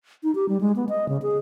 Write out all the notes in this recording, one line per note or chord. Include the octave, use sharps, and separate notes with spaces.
D#4
G4
G3
G#3
B3
D#5
C#3
G#4